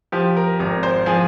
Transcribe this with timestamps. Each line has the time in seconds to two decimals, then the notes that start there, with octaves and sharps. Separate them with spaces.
0.12 F3 G4
0.37 A#4
0.59 G#1 A#4
0.83 C5
1.06 F3 G#4